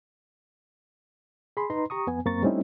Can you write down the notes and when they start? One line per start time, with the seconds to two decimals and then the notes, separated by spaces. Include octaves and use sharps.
1.57 G#4 B5 C6
1.70 D#4 B4 A#5 C6
1.90 G4 A#5 C#6 D#6
2.07 F2 B3 G#5
2.25 F#2 A#3 C4 A#5 C#6 A6
2.43 G3 A3 C4 C#4 D#4 E4